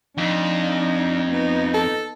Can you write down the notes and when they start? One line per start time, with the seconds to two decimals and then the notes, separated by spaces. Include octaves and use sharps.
0.18 F2 D4 D#4
1.31 B3 D#4
1.74 A4